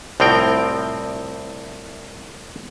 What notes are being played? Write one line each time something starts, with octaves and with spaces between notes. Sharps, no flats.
C2 A2 F3 C4 A#4 G5